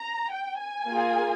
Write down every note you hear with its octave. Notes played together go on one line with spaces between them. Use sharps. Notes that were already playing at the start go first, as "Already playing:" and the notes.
Already playing: A#5
G5
G#5
A#3 F4 G#4